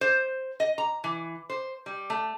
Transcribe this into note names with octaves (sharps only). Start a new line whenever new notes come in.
C5
D#5
A#5
E3
C5
G3
A3